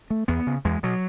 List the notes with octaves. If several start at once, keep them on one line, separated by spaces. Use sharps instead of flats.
A3
E2 B3
C#3
E2 G#3
B2 F#3